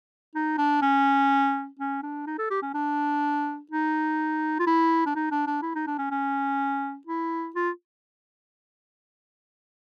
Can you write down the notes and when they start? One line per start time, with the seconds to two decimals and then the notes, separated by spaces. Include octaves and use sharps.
0.35 D#4
0.58 D4
0.82 C#4
1.80 C#4
2.03 D4
2.27 D#4
2.39 A4
2.51 G4
2.63 C#4
2.74 D4
3.72 D#4
4.59 F4
4.67 E4
5.06 D4
5.16 D#4
5.32 D4
5.47 D4
5.62 E4
5.76 D#4
5.87 D4
5.99 C#4
6.11 C#4
7.07 E4
7.56 F4